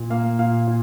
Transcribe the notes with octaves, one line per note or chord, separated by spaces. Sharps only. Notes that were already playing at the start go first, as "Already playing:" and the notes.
Already playing: A#2
A#3 F5
A#2 F5
A#2